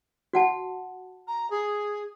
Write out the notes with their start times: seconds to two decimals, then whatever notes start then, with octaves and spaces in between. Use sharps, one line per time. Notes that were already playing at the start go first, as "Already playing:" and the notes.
0.33 F#4 F#5 A5
1.27 A#5
1.50 G#4